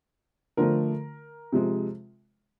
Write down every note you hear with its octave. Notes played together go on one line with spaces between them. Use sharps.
D3 F3 A3 A#4
C3 F3 G#3